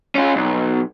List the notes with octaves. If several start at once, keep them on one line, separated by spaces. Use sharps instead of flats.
C#4 F4
B1